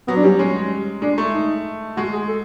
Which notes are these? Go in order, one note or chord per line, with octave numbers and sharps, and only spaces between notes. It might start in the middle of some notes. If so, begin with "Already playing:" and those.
F#3 B3
D4
G3 C#4
G#3 C#4
G#3 D4
A3
D#4
G#3 F#4
G#4
A4